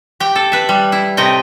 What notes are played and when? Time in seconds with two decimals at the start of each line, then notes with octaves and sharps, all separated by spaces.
0.20 G4 G5
0.36 A4
0.52 B4 E5
0.69 G3
0.92 E4
1.17 A2 C3 D#5 G5